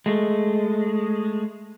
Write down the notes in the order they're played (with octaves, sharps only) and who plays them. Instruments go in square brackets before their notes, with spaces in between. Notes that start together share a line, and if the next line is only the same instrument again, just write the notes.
[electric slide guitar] G#3 A3